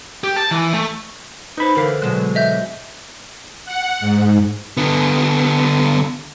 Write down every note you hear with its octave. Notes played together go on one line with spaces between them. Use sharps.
G4
A5
E3
A3
D#4 B4 C5 B5
D3 E3 A#4 F5
B2 F#3 G#3
D#5 E5 G6
F#5
G#2
D3 B3